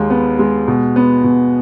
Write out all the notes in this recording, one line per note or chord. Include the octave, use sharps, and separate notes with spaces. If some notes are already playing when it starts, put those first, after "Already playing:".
Already playing: D#2 G#3
B3
G#3
B2
B3
B2